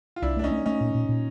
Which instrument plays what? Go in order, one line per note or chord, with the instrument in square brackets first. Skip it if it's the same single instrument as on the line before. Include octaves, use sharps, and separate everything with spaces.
[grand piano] F4
[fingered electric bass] C2 [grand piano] D4 E4
[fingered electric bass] A3 [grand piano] D4
[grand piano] C#4 D#4
[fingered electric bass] A3
[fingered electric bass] A3 [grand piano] C#4 D#4
[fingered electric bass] A#2
A#2
A#2